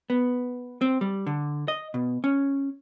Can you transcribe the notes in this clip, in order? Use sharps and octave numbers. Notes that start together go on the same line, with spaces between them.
B3
C4
G3
D3
D#5
B2
C#4